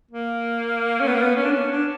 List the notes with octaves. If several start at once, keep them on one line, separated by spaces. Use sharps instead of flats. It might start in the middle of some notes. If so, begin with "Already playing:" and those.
A#3
C#4
B3
A#3
B3
C#4
D4
C#4
D4